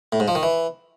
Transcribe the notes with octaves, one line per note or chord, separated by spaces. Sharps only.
A2
G#2
F3
D#3
E3